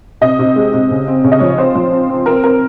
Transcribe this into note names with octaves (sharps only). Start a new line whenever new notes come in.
C3 D#5
C3
G#3
C3
C#3
C4
C#3 C#5
D#5
F3 C#5
C4 C5
F3
C4
C4
C4 A#4
C4 A#4